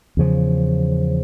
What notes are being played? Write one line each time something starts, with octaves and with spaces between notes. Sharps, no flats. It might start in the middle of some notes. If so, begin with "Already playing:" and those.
E2 C#3 F3